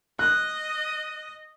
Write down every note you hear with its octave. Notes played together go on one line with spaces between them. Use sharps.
D#5 F#6